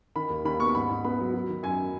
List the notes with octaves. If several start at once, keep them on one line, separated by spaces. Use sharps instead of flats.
D#3 B5
D#2
D#2 B5
B3 C#6
C#6
G#2 B5
G#2
B3 B5
F#3
F#3
D#3
F#2 G#5